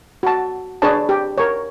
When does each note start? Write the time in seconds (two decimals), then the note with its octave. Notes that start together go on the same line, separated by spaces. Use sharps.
0.23 F#4 A5
0.82 D4 G#4 B4 C#5 A5
1.09 G4
1.38 A#4 C#5